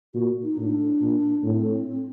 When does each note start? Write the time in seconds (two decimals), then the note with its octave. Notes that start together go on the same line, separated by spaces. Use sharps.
0.14 A#2 F#4
0.43 D#4
0.57 A2 D4
1.01 A#2
1.44 A2 C4